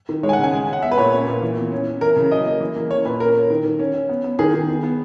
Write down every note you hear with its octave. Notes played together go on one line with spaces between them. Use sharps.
D#3
G#3 C#5
G#5
F#5
C#3
G#5
G#3
C#4 F#5
B3 E5
B4
A#2 C#5
C#4 C#5
A#2
E3
B3
C#4
C#4
E3 A#4
C#3
F#3 D#5
A#3
E3
A#3
C#4 C#5
A#2 B4
C#4 A#4
C#4
D#3
D#3
C#4
C#4
B3
B3
D#3 G#4
D#3
B3
B3